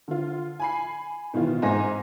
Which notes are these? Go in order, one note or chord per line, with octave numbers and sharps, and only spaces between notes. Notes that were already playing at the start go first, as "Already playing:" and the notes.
D3 F4
G#5 B5 C7
B2 D#3 E3 F4
G#2 C4 D#4 G#5 A#6